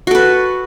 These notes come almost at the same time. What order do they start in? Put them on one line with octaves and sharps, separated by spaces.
F#4 A4 B4